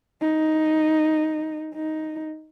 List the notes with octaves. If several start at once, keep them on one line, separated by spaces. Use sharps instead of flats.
D#4
D#4